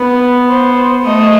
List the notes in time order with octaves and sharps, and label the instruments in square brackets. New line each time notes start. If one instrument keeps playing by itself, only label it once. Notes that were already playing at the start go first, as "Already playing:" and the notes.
Already playing: [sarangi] B3 [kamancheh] B4
[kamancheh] C5
[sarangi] A3 [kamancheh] D#5